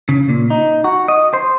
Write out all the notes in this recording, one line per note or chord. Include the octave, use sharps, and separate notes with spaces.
C#3
A#2
D#4
F#4
D#5
C5